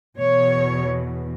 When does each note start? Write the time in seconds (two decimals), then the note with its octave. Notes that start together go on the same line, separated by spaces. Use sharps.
0.18 E2 B2 C#5